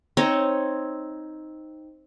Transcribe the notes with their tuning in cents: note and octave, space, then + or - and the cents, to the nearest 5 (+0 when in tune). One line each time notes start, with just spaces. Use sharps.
C4 +5 D#4 +0 C#5 +0